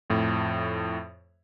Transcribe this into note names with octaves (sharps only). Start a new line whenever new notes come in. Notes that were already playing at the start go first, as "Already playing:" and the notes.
F2 A2